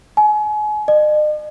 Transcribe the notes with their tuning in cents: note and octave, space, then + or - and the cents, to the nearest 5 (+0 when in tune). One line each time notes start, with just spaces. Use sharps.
G#5 +35
D#5 -45